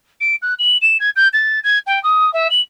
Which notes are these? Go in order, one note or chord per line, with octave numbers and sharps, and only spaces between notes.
D7
F#6
F#7
E7
G#6
G6
A6
G#6
G5
D#6
E5
F#7